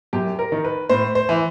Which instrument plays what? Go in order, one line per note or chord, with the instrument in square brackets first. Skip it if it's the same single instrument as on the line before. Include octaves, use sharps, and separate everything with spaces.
[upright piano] F#2 G4
A#4
D#3
B4
A2 C5
C5
E3